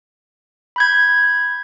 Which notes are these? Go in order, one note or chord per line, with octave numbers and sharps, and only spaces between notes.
B5 G6 G#6